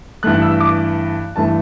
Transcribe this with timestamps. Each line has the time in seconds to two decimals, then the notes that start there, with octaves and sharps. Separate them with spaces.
0.23 G2 E3 A3 F#6
0.42 E6
0.60 D6
1.36 G2 E3 A3 A5